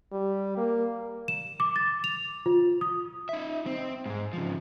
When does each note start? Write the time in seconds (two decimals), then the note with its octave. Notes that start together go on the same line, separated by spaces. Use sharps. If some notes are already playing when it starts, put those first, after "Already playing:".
0.12 G3
0.57 A#3
1.28 E7
1.60 D6
1.76 A6
2.04 F7
2.46 F4
2.81 D#6
3.29 D#4 E5
3.66 C4
4.06 G#2 G#3
4.33 C#3 F3